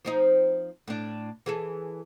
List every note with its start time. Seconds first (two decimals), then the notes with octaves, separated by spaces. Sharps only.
0.05 F3 C4 D#4
0.88 A2 D4
1.46 E3 G#4 A4